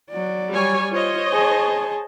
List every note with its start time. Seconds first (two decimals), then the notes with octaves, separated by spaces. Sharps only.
0.10 F#3 D5
0.51 G3 C#5 G#5
0.92 F4 C5 C#5 D#5
1.33 G#4 A5